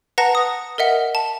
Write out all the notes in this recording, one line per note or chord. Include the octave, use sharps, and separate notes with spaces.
B4 F#5 A5 A#5 A#6 F7
D#6
A#4 D#5 E5 F#5
A5